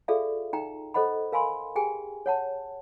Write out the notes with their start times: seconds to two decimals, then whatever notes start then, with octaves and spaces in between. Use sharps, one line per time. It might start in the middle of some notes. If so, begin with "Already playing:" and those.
0.08 F4 G#4 A4 D5 E5 F5
0.53 D#4 G5 A#5
0.94 A4 C5 D#5 F#5 B5
1.32 A#4 F5 G#5 B5 C6
1.76 G4 G#4 G5 G#5
2.26 C#5 F#5 A5